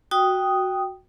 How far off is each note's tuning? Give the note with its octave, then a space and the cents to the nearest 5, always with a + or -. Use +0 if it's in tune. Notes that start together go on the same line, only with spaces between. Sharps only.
F#4 +0 G5 +0 D#6 +0